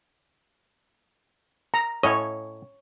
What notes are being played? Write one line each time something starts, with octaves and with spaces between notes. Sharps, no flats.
A#5
A2 C#4 C#5 D#5